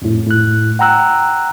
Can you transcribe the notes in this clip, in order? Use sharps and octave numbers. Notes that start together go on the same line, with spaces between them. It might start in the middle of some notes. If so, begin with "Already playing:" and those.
F2 A2
A2 F#6
F#5 G5 A#5 E6 F#6